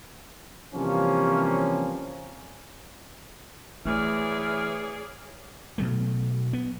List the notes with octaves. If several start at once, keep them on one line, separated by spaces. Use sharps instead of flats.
C3 E3 F3 G3 A#3 C#4
E3 A3 G#4 C#5 D5 F6
B2 F#3 A3
B3